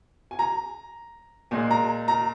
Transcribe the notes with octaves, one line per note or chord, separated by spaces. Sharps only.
G#5
A#5
A#2 G#3 G#5
A#5
A#5